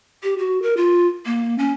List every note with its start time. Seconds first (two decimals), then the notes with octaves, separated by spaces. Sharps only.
0.23 G4
0.38 F#4
0.62 A#4
0.77 F4
1.26 A#3
1.59 C#4